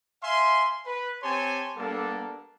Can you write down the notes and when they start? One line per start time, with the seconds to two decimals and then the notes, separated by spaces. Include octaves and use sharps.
0.23 E5 F5 G#5 C6
0.85 B4
1.23 C4 G4 C#5 G#5 A5 C6
1.77 G3 A#3 B3 D4 A4